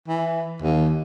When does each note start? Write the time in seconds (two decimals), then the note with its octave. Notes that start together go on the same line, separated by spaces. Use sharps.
0.08 E3
0.62 D#2